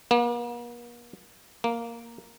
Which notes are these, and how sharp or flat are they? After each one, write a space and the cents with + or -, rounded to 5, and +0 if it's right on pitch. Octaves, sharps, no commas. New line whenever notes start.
A#3 +45
A#3 +0